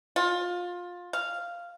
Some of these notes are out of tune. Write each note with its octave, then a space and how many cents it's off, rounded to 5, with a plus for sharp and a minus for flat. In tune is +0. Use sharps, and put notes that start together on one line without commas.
F4 +20
F5 -5